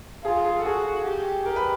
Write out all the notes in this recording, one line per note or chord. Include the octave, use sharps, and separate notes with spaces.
F4 G#4
G#4
A4
F#4 G#4
G4
G4 A#4
B4